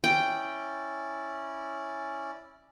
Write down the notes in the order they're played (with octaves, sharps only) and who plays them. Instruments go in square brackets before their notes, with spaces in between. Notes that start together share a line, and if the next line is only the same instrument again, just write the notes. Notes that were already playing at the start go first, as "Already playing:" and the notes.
[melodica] C#4 E4 D5 [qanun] G5